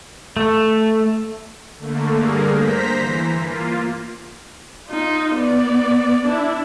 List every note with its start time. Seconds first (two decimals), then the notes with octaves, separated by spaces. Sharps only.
0.37 A3
1.77 D3 A3 A#3
2.13 G2 D3 A#3 G#4 A#4
2.55 C5 A#5 B6
2.98 E3
3.38 A#3 F4
4.88 D#4 F4
5.35 B3 D5
6.26 D4 E4